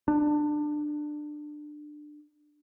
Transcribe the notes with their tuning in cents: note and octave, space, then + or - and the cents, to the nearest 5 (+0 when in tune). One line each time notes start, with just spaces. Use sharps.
D4 +20